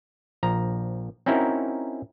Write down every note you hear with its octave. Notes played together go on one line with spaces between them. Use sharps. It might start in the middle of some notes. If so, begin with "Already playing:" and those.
A#1 F3 A#5
C4 C#4 D#4 E4 F#4 A#4